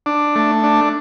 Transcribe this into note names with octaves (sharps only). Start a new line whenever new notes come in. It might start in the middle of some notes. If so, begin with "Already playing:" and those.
D4
A3
D4